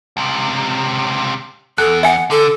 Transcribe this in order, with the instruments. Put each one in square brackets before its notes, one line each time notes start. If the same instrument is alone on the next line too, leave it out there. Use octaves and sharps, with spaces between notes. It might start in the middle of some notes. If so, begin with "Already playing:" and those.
[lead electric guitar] C#2 C3
[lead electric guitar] E2 [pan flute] A4 [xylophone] F#6
[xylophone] E5 G#5 [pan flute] F#5
[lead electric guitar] D3 [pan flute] A4